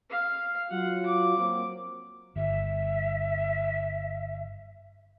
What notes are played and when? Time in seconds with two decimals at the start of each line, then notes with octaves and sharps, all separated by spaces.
0.10 F5
0.71 F#3 F4 F#5
1.06 D6
1.38 F#3 A#3 C4
2.36 G1 E5